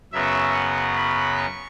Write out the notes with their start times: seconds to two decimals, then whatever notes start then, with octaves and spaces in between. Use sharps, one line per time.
0.12 F#2 C#3 F#3 B3 E5
0.53 F#5
0.96 B5
1.37 C#6